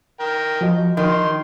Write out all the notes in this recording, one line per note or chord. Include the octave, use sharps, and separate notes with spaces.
A#4 G5
F3 F#4 D#5
D#3 D#4 C6